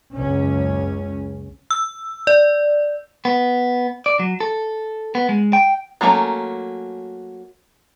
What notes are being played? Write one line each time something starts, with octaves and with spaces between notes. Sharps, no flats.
F#1 C#2 C#4
E6
D5
B3
D5
F#3
A4
B3
G#3
G5
F#3 A3 A#3 C4 C#4